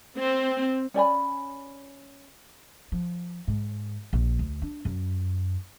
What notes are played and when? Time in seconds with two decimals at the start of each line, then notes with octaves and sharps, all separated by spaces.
0.17 C4
0.94 C#4 D5 G#5 B5
2.92 F3
3.48 G#2
4.13 A#1
4.39 D2
4.62 D4
4.85 F#2